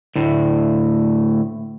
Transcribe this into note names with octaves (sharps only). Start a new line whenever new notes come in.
D2 A2